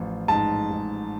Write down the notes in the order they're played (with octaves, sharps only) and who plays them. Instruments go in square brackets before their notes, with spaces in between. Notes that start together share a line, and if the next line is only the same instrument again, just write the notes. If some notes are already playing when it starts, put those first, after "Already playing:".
Already playing: [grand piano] A1 F3
G#2 A5
G#2